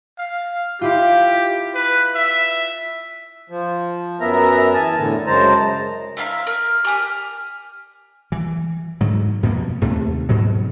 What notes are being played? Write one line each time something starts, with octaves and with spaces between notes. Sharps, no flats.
F5
E4 F4 G4
B4
E5
F3
F#2 B3 A#4 E5 A#5
E2 G#5 A5
A2 D3
F#2 C#3 G#3 C5 A5 A#5
E4 E5 F5 A#5
A#4
G4 G#5 F6
E3
G#2 D3 F#3
F#2 B2 F3 A#3
D#2 C3 A3
G#2 B2 F#3